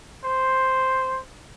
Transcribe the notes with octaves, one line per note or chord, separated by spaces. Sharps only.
C5